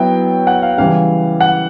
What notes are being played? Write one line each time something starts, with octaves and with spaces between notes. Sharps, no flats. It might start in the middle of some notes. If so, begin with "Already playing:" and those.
Already playing: F#3 B3 E4 G5
F#5
F5
C#3 E3 G3 F5
F#5